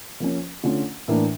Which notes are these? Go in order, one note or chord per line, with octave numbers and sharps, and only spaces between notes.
F3 A#3 C#4
D3 A3 C#4 F4
A2 E3 A#3 D4